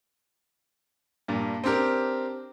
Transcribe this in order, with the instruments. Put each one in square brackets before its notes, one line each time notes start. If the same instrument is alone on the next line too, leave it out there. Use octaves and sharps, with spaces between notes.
[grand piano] G2 A#2
C4 D4 G4 A#4